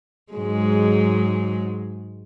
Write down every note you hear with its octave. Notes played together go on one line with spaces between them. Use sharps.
G#2 F#3 G#3